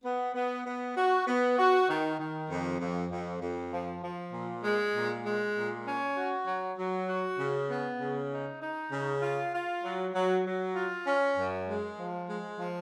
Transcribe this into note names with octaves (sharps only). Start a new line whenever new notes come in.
B3
B3
B3
F#4
B3
F#4
D#3
D#3
F2
F2
F2
F2
F3
F3
A#2
G#3
A#2
G#3
A#2
C#4
F#4
F#3
F#3
F#4
C#3
B3
C#3
D#4
D#4
C#3
F4
F4
F#3
F#3
F#3
F4
C#4
F#2
G#3
F3
G#3
F3